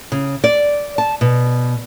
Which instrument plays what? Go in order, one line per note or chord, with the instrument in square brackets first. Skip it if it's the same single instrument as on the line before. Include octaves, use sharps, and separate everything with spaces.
[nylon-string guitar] C#3
D5
A5
B2